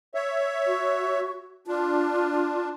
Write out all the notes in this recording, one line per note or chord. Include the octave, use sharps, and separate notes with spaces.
C#5 E5
F#4
D4 F4